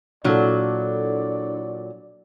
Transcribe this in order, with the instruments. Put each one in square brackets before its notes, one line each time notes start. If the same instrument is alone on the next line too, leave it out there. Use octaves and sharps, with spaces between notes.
[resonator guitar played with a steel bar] A#2 F#3 [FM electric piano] D4 E4 A4 [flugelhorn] D5